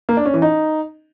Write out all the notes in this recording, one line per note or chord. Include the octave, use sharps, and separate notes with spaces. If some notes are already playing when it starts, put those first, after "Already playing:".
A#3
D4
C#4
E3
D#4